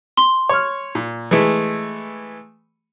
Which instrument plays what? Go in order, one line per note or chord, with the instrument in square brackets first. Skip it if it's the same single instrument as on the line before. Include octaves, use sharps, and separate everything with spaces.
[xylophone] C6
[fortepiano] C#5 F6
A#2
E3 G#3 A3